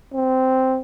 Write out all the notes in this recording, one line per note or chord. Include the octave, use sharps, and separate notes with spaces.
C4